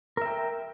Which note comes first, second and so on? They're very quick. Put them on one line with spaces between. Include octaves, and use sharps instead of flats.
A#4 E5 G5